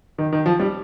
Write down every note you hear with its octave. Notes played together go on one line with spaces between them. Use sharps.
D#3
D#3
F3
G3